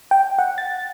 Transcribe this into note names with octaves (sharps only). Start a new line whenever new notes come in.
G5
F#5
A6